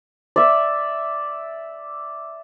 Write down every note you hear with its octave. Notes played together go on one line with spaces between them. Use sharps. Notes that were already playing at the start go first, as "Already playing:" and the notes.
D5 E5